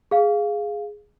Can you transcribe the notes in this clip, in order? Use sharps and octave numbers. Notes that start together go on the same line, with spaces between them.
G#4 F5